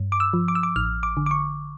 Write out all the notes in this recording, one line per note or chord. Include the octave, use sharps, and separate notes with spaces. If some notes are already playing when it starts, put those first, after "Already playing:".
Already playing: G2
D6
E6
F3
D6
E6
D6
A1 F6
D6
D3
D6
C#6